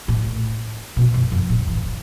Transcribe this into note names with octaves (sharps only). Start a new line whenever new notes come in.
A2
B2
G2
F2
A2
E3